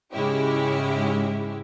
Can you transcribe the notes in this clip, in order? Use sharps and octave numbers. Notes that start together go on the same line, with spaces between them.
G#2 C#3 G#3 C#4 E4 G4